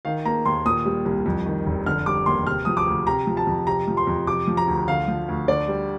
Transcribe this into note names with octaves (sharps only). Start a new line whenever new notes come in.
D#3 F5
A#3 A#5
D#2 C6
A#2 D#6
G3
C2
F2
D#3
F1
D3 F6
G3 D6
D#2 C6
C3 F6
F3 D#6
D6
D2
C3 A#5
F3
A5
F2
C3 A#5
F3
C6
F2
C3 D6
F3
A#5
D2
D3 F5
F3
D2
D3 D5
G3